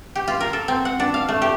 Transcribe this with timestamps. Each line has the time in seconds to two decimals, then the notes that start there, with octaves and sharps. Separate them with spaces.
0.15 G4
0.28 F4
0.40 A#4
0.53 A4
0.68 C4
0.85 F#5
1.00 D4
1.14 F5
1.29 A3
1.42 G4